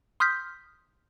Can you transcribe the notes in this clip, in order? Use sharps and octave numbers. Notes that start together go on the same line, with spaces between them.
C6 D#6 F6 G6 B6